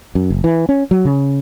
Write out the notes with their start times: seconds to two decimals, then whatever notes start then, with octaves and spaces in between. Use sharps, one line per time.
0.15 F#2
0.30 F#1
0.44 E3
0.69 C#4
0.91 F#3
1.05 C#3